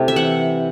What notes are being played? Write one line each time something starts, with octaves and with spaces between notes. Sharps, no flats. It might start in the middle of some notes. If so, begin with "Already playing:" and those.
Already playing: C3 A3 E4
E5
E3 F#5